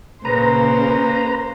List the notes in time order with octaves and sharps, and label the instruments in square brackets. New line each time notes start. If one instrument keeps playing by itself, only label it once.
[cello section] A#2 C#3 [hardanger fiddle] A#3 C5 [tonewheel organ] B4 A#5